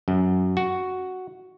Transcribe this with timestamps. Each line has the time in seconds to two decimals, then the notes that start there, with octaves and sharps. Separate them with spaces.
0.08 F#2
0.57 F#4